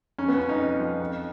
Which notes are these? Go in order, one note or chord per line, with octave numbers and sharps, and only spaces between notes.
F2 C#4
B3
F3 C#4
D#4
F2
F3
F2